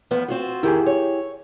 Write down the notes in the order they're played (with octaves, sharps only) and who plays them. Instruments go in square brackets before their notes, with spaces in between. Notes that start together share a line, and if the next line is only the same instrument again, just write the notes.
[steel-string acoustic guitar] E2 F3 B3
C4 F4 F#4
[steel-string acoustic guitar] D#3 [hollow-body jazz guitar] E4 G4 G#4
[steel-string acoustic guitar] C#5